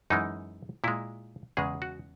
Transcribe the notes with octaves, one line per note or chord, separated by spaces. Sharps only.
F#2 E3 G#3 D#4
A#2 G#3 E4
E2 C#3 G#3 G#4
F#4